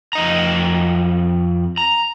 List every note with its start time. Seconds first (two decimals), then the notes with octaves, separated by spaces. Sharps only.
0.13 F2 D#5 A#5
1.77 A#5